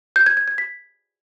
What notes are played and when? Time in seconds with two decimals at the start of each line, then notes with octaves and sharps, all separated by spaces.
0.16 G6
0.26 G#6
0.37 G#6
0.48 G#6
0.58 B6